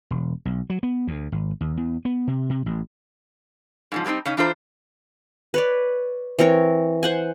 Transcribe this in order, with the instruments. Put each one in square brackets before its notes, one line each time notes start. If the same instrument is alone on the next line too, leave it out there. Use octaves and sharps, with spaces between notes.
[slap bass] E1
B1
F#3
B3
D2
G#1
D#2
E2
B3
C3
C3
A1
[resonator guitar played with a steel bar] G#2 C#3 F3
F#3 G3 A#3 C4 D#4
C#3 C#4 D#4
E3 D4 F4 A4 C5 A#5
[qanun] B4 C#5 D5
E3 C4 A#4 C#5
C5 F#5 G#5